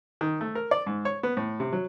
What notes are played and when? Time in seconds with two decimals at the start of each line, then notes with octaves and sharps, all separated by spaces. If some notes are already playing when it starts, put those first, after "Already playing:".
0.21 D#3
0.41 A3
0.55 A#4
0.71 D5
0.86 G#2
1.05 C#5
1.23 B3
1.37 A2
1.60 C3
1.73 F#3